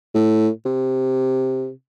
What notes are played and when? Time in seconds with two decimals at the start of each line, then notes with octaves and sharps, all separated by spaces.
0.15 A2
0.66 C3